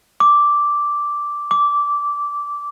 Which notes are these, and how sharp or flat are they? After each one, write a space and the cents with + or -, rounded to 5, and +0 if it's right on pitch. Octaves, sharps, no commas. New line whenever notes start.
D6 -5
D6 -15